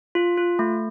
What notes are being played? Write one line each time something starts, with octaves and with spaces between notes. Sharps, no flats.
F4
F4
A3